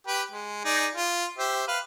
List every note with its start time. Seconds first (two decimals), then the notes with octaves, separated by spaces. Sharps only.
0.07 G4 B4 G5
0.31 G#3
0.65 D#4 G#4 D5
0.95 F4
1.38 G4 C5 E5
1.68 B4 F5